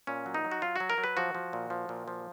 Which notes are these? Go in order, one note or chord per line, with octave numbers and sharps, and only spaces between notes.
A#2 C#4
F#3
D#4
F#3
F#4
F#3 F4
F#3 F#4
A#4
F#3
B4
F3 F#4
F3
A#2
F3
A#2
F3